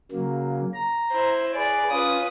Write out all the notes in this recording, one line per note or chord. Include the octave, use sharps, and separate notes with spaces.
C#3 F#3 A#3
A#5
E4 C5
G#4 B4 D5
C#4 F4 B4 D#6